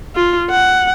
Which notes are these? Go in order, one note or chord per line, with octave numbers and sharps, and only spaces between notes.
F4
F#5